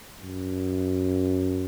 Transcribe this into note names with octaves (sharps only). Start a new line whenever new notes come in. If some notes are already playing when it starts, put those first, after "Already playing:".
F#2